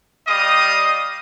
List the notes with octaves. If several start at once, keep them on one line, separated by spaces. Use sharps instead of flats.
G3 D#5 F5 D#6